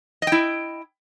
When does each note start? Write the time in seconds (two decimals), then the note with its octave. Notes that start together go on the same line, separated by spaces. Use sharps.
0.22 D#5
0.27 G5
0.32 E4